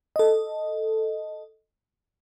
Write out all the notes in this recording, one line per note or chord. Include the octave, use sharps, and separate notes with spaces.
A4 D#5